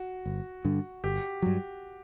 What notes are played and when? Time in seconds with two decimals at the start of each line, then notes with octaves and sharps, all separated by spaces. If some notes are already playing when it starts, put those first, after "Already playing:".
Already playing: F#4
0.26 G1
0.65 G2 D3
1.04 G1 G4
1.42 G2 F#3